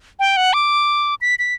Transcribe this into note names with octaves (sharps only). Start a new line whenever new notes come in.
G5
F#5
D6
B6
B6